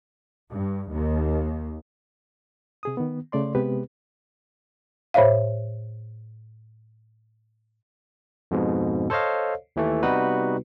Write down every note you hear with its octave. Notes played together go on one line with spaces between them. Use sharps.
G2
D#2
C3 G#4 D#6
D#3 B3
C#3 A3 D5 C6
C3 G#3 B3 G4 B4
A2 C5 C#5 E5 F5
F2 G#2 B2
A4 C5 C#5 D#5 F5
D#2 E3 A3
C3 G3 B3 D#4 F#4 B4